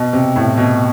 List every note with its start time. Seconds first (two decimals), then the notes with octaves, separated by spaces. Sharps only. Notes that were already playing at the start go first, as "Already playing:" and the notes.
Already playing: B2
0.13 C3
0.36 A2
0.58 B2